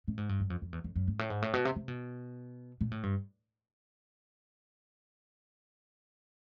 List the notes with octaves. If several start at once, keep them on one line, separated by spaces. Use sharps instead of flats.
A2
G#2
G2
F#2
F2
F2
E2
F2
F#2
G#2
A2
G#2
A2
B2
C3
C3
B2
A#2
A2
G2